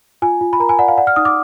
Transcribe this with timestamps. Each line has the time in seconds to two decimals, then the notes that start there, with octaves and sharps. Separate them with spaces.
0.22 F4 G#5
0.41 F4
0.53 B5
0.60 A#4 A#5
0.69 G#5
0.79 D5 F#5
0.88 F5
0.98 D5 F#5
1.07 F6
1.16 D#4 D#6
1.25 D6